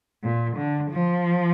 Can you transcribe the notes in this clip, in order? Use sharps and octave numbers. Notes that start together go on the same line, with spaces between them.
A#2
D3
F3